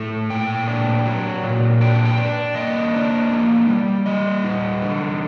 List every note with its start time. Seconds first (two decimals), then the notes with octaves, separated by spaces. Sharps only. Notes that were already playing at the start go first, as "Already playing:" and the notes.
Already playing: A2 A3
0.30 A#2 G5
0.67 D4
1.05 F#3
1.44 A#2
1.81 D4 G5
2.05 G5
2.18 D4
2.55 A#3 D#5
2.94 D4
3.32 A#3
3.68 G3
4.06 G3 D#5
4.44 D#4
4.82 D3